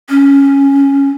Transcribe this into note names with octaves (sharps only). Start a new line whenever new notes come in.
C#4